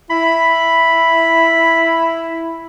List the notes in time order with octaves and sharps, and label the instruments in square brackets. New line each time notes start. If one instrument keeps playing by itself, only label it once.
[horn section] E4 [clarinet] B5